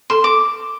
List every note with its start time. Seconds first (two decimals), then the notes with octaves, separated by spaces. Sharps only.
0.10 A4 C6
0.24 D6